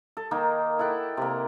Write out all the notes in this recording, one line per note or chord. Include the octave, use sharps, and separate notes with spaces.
A4
D#3 A#3 D#4
E4 A4 F#5 G5
C3 A#3